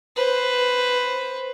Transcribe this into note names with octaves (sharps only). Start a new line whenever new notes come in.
B4 C5